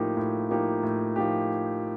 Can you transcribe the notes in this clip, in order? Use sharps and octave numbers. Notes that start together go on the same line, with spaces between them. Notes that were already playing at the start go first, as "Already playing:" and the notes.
Already playing: A2 F3 A#3 D#4 G4
A2
F3 A#3 D#4 G4
A2
F3 A#3 D#4 G4